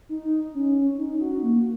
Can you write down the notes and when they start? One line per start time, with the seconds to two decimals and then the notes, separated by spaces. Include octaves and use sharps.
0.09 D#4
0.55 C#4
0.98 D#4
1.21 F#4
1.43 A#3